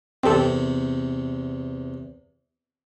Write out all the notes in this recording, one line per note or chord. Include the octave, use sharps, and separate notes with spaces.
E2 C3 C4 G4 A4